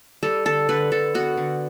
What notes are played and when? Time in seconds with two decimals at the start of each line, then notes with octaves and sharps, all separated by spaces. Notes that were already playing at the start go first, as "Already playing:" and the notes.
0.23 G3 A4
0.45 D3 A4
0.69 D3 B4
0.91 D3 A4
1.14 B3 F#4
1.37 D3